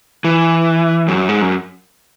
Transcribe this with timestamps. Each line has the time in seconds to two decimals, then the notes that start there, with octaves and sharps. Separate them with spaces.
0.24 E3
1.08 F#2
1.29 G#2
1.42 F#2